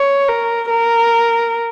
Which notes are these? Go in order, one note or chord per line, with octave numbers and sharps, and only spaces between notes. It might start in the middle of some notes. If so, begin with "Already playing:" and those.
Already playing: C#5
A#4
A#4